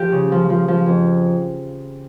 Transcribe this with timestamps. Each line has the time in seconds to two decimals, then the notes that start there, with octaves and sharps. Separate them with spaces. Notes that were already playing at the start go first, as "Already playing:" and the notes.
Already playing: F3 G4
0.12 C#3
0.32 F3
0.50 F3
0.68 F3
0.86 F2